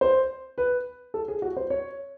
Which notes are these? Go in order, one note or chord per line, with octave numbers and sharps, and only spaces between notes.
C5
B4
A4
G#4
F#4
C5
C#5